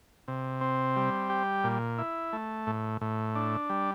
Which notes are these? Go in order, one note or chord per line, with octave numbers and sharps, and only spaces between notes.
C3
C4
G3
G4
A#2
E4
A3
A2
A2
D4
G3